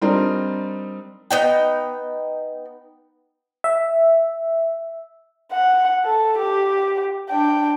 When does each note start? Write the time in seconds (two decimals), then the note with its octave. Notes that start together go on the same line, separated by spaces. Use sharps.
0.02 G3 C4 D4 D#4 A#4
1.31 B3 D#4 G5
3.64 E5
5.52 F#5
6.05 A4
6.39 G4
7.29 D4 G5